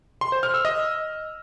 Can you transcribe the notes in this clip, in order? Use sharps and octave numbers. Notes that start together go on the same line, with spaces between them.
C6
C5
F6
E6
D#5